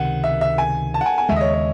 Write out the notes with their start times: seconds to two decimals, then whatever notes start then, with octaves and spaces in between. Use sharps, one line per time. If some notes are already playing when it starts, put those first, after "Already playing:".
Already playing: C#2 C3 D#3 F#5
0.24 E5
0.41 E5
0.58 G#5
0.94 A5
1.01 F#5
1.06 G#5
1.18 G#5
1.29 D#2 C#3 G#3 E5
1.36 D#5
1.41 C#5
1.54 C#5